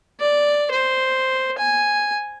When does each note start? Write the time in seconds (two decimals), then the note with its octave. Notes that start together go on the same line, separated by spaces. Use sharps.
0.20 D5
0.71 C5
1.58 G#5